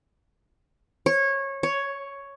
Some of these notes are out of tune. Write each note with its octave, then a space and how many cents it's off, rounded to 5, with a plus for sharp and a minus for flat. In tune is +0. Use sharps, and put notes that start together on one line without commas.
C#5 -20
C#5 +5